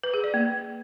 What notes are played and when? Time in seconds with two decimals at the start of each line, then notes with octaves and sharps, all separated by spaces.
0.03 B4
0.14 G#4
0.24 D5
0.34 A#3